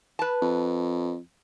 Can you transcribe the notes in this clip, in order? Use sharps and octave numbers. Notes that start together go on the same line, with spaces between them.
B4 A5
F2